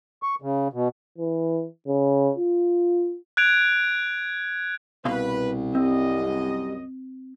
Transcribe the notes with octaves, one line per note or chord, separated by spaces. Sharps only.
C#6
C#3
B2
E3
C#3
F4
F#6 G#6 D7 F7
C2 B2 B4 F5 C6
F#2 G3 C4 D#5